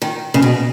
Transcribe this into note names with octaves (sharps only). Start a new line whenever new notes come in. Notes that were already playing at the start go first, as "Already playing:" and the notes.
D#3
C#3
B2